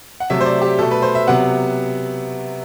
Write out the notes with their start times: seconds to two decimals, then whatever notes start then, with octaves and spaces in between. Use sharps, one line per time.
0.20 F#5
0.30 C3 F#3 A3 E5
0.41 C5
0.46 D5
0.62 G4
0.79 B2 A3 A4
0.91 B4
1.02 C5
1.15 E5
1.27 C3 F#3 B3 F#5